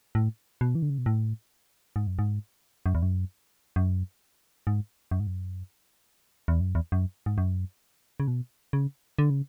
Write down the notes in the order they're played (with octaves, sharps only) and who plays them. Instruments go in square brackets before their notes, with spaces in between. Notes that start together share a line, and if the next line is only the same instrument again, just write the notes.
[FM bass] A2
B2
E3
D3
C#3
B2
A2
G#2
F#2
G#2
F#2
E2
F#2
F#2
G#2
F#2
G#2
F#2
E2
F#2
E2
F#2
G#2
F#2
C#3
B2
C#3
D3
C#3